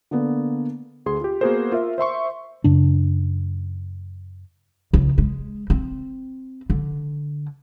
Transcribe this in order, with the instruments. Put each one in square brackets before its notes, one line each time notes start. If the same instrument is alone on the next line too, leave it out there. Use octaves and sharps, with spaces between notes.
[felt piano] D3 A#3 B3
[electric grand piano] D2 G#4 C6
F4 G4
A#3 B3 F#4 G#4 A#4 C5
F4 A#4 E5
C5 E5 C6 C#6
[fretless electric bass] F#2 C#3 D4
[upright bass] C#2
G#3
C4
D3